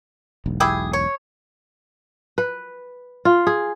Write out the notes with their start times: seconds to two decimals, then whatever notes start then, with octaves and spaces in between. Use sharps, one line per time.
0.46 E1 B1
0.60 E4 G4 G#4
0.93 C#5
2.38 B4
3.25 F4
3.47 G#4